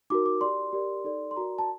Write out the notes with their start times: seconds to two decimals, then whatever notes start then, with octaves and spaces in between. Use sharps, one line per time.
0.10 D#4 F#4 A#4 D6
0.26 D6
0.41 G4 D5 C6
0.73 G4 A#4 D5
1.04 D#4 A4 D5
1.31 C6
1.36 F#4 A#4 D5 A#5
1.58 A5